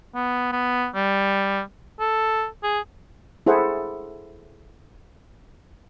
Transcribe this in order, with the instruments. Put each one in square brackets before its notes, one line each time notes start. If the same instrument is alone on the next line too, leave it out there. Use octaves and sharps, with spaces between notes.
[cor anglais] B3
B3
G3
A4
G#4
[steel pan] E4 G#4 A4 C5 F#5